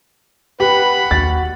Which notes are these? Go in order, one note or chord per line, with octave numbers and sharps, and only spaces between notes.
G4 B4 F#5 B5
D#2 F#4 A6